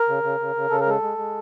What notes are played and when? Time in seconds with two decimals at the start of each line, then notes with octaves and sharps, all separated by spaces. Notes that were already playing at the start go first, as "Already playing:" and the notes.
Already playing: A#4
0.09 C#3
0.23 C#3
0.40 C#3
0.56 C#3
0.70 C#3 A4
0.81 A#4
0.86 G#3 A4
1.02 G#3
1.18 G#3